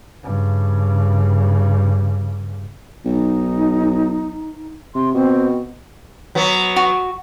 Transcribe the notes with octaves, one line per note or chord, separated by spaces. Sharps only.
G2 C#3
B1 D#4
C3 C6
B2 C4
F#3 B3
F#4